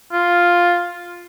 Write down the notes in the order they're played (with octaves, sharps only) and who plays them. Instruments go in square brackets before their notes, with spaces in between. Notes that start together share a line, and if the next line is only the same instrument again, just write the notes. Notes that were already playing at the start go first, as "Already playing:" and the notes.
[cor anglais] F4